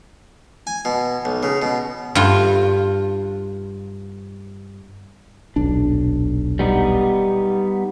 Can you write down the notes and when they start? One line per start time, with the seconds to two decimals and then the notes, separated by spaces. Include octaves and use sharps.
0.67 G#5
0.85 B2
1.25 B1
1.43 C#3
1.62 B2
2.15 G2 F4
5.56 D#1 B1 D4
6.59 G3 B3 D#4